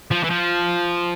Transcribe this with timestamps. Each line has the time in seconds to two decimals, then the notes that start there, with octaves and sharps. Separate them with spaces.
0.11 F3
0.24 E3
0.30 F3